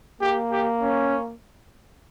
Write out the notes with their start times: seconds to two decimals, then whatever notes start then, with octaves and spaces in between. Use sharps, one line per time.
0.21 A#3 G4
0.52 G4
0.81 C#4